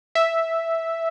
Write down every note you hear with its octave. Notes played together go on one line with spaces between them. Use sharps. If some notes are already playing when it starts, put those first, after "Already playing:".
E5